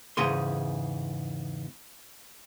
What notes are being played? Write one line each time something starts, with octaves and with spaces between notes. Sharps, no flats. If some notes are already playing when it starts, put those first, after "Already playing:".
E2 G#2 C#3 G#4 C6